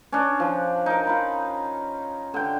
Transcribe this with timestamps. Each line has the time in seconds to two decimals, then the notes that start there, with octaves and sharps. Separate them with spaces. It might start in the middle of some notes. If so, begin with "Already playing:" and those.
0.12 C#4 D4
0.40 F3
0.86 D#4 A#4
1.07 F4 B5
2.34 D3 G5